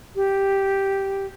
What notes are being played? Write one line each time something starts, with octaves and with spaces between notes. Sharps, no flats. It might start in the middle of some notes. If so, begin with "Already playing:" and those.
G4